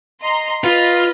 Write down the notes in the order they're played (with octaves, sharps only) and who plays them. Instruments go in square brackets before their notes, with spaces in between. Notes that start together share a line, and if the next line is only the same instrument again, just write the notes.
[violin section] D#5 A#5 C6
[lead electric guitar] F4 [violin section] B4 D#5